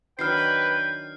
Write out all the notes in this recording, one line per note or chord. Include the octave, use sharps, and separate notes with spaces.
D#3 F#3 D4 B4 G5 F6 C7